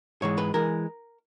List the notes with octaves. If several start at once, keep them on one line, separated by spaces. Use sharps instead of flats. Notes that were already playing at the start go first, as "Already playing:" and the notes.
G#2 E3 G#3 C#5
B4
E3 G#3 A#4